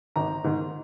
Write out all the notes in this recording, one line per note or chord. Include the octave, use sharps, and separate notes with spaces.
G#1 A#5
G#2 D#3